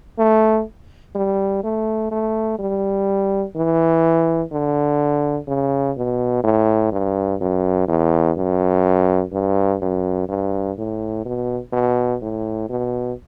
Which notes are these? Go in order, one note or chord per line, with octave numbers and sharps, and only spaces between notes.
A3
G3
A3
A3
G3
E3
D3
C#3
B2
A2
G2
F#2
E2
F#2
G2
F#2
G2
A2
B2
B2
A2
B2